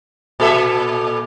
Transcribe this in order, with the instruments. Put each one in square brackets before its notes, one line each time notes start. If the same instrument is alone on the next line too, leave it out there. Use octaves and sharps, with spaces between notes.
[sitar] A#2 A4 E5